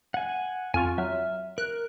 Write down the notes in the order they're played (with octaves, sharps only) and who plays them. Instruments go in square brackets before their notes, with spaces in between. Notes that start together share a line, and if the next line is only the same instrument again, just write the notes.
[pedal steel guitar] F#5 G#5
[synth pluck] F2 F4 [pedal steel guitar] G#5 C#6
[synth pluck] F#3 [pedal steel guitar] E5 F6
[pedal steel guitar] A#4 [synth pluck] F#6